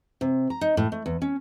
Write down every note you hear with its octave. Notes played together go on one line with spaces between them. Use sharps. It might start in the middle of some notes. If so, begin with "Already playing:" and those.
C3
A#5
D#4
A2
A3
E2
C#4